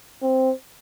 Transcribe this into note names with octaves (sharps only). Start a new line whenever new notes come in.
C4